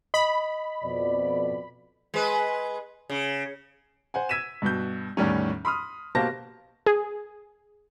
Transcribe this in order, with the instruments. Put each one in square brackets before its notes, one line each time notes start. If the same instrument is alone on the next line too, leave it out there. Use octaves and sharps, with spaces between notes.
[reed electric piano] D#5 [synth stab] B5
[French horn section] F2 B2 D5
[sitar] G#3 B4
C#3
[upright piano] C5 F#5 G#5
E6 G#6 B6 D#7 E7
G2 B2 G6
E2 A2 D#3 G3 C#4
B5 C6 D#6 F6
B2 A#3 G4 C5 A5 A#6
[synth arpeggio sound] G#4